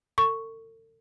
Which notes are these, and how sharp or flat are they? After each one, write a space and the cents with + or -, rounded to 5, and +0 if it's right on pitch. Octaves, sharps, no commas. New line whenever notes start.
A4 +40 C#6 +0